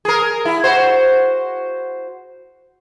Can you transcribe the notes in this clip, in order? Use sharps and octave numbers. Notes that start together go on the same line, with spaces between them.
G#4 A#4
E4
F#4 C5